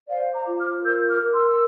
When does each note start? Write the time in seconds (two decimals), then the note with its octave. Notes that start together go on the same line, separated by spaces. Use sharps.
0.08 C5 D5 F5
0.34 A#5 D6
0.46 F4
0.59 D6 F6
0.84 A#4 E6 G6
1.09 D6 F6
1.22 A#4
1.34 C6 E6
1.49 E6